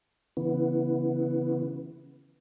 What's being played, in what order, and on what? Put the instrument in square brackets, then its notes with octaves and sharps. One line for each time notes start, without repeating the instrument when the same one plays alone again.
[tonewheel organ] C#3 E3 B3